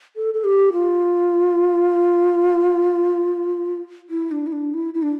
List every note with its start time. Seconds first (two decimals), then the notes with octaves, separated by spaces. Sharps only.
0.16 A4
0.34 A4
0.44 G4
0.73 F4
4.10 E4
4.31 D4
4.47 E4
4.52 D4
4.74 E4
4.94 E4
5.02 D4